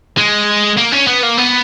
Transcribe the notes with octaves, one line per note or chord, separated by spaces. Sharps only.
G#3
A#3
C#4
B3
A#3
B3